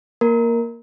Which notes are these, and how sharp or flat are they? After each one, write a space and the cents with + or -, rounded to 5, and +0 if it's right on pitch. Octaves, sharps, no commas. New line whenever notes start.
A#3 +0 A#4 +0